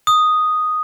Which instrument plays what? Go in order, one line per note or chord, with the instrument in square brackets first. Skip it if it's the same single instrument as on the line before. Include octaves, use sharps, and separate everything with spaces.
[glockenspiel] D#6